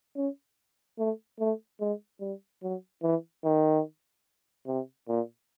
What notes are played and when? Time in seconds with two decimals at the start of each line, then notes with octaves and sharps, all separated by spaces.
0.16 C#4
0.98 A3
1.39 A3
1.80 G#3
2.20 G3
2.62 F#3
3.03 E3
3.44 D#3
4.67 C3
5.08 A#2